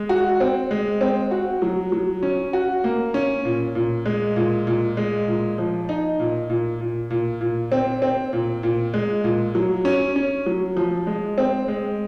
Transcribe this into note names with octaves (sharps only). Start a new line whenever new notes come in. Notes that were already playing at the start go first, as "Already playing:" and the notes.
Already playing: G#3
F#4
C4
G#3
C4
F#4
F#3
F#3
C#4
F#4
A#3
C#4
A#2
A#2
G#3
A#2
A#2
G#3
A#2
F3
D#4
A#2
A#2
A#2
A#2
A#2
C4
C4
A#2
A#2
G#3
A#2
F#3
C#4
C#4
F#3
F3
G#3
C4
G#3